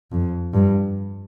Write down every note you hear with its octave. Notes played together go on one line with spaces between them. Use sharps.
F2
G2